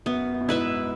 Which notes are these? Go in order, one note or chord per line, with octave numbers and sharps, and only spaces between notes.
F#2 B3
F#2
B2
G#2 E4 B4 E5